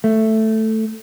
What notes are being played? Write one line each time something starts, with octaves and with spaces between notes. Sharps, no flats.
A3